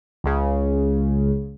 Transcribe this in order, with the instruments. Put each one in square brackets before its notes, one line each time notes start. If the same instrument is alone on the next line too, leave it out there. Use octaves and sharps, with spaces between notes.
[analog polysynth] C#2 C#3